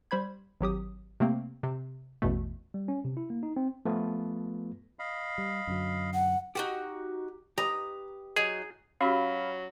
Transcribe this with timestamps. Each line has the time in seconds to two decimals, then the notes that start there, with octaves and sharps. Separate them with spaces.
0.11 G3 C5 B5 G#6
0.61 G#1 F#3 G4 D#6
1.20 C3 A3 A#3 C4
1.63 C3
2.22 A1 E2 B2 A3
2.74 G3
2.88 C#4
3.05 C3
3.17 E4
3.30 A#3
3.43 D#4
3.57 C4
3.85 F3 A3 B3 F4 B4
4.99 D#5 F5 B5
5.38 G3
5.67 F#2 D3 F#3
6.14 F#5
6.55 D#4 F#4 G4 F#5
7.58 G4 B4 D#5 A#5
8.36 F#3 D#4 G#4
9.01 F#3 C#4 F#4 G4 F5 B5